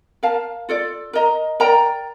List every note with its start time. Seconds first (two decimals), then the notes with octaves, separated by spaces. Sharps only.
0.23 A#4 F5 A5
0.69 F4 A4 D5
1.13 A#4 D#5 A#5
1.60 A#4 D5 G5 A#5